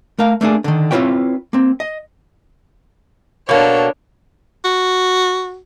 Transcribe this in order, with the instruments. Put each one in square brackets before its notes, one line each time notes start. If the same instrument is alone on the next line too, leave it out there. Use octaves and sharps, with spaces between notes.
[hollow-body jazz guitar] A3 A#4 F5
A3 A#3 D4 G#4
D3 D#3
C4 E4 F4 B4 C#5 G5
A#3 C4
D#5
[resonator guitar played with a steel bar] B2 A#3 [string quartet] D4 A4 C#5
[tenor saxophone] F#4